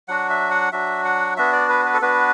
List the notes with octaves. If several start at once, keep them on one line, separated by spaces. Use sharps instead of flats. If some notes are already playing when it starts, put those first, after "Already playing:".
F#3 D4 F#4 F#5
E5
F#5
F#3 D4 F#4 E5
F#5
B3 D4 F#4 E5
D5
B4
B4
A4
B3 D4 F#4 B4